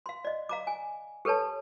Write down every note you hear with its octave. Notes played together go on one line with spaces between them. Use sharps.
F5 C6
D5 D#5
F5 A#5 D6
G#5
G4 A4 B4 C#5 A5